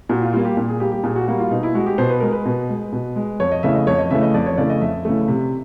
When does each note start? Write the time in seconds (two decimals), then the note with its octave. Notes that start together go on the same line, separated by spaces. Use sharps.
0.09 A#2 F#4
0.22 F4
0.33 G3 A#3 F4
0.45 G4
0.57 A#2
0.68 G#4
0.80 G3 A#3 G4
0.92 G4
1.04 A#2 G#4
1.16 F#4
1.27 G3 A#3 F#4
1.40 F4
1.51 B2 D#4
1.63 E4
1.75 G#3 F#4
1.86 G4
1.98 B2 C5
2.09 B4
2.21 G#3 A#4
2.32 B4
2.46 B2
2.69 G#3
2.93 B2
3.16 G#3
3.40 F2 C#5
3.52 D#5
3.63 C#3 E3 A3 E5
3.75 D#5
3.87 F2 C#5
3.98 D#5
4.11 C#3 E3 A3 E5
4.22 D#5
4.34 F2 D5
4.46 C#5
4.58 C#3 E3 A3 D5
4.70 D#5
4.81 F2 E5
5.05 C#3 E3 A3
5.28 C3